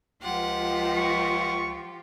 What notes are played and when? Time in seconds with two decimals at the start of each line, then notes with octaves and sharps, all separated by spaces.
0.22 C#2 F3 F4 G4 F#5
0.96 C#6